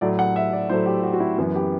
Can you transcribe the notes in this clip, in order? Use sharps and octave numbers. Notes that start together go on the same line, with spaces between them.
A2 F#3 A3 D5
F#5
E5
D5
A2 F#3 A3 C5
G4
F#4
F#4
E4
F#2 E3 B3 E4 F#4
G4